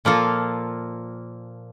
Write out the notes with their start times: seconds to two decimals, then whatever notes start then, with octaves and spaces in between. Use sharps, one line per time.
0.05 A#2 F3 A#3 F4 A4